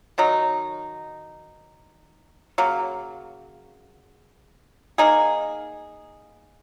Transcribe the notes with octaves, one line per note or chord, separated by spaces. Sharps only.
D#3 F#3 D#4
C#3 F#3 A#3
A#3 D#4 G#4